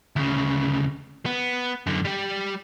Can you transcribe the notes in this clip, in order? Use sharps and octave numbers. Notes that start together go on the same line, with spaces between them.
D2 C#3
B3
F#2 D3
G3 G4